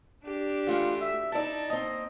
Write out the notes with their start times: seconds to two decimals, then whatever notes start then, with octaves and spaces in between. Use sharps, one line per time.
0.24 D4 G4
0.67 E3 A3 F4 F#4
1.01 E5
1.32 D#4 E4 D5 A5
1.70 A#3 C4 D#5